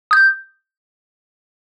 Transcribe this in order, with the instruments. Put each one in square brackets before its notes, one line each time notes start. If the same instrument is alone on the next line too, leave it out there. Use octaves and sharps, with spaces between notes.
[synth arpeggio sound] D#6 G6